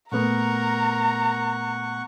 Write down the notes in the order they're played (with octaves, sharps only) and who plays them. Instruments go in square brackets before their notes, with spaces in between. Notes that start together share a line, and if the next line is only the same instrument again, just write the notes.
[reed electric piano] A#2 A3 B3 [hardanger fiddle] A#4 [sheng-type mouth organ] F#5 C#6 [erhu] A#5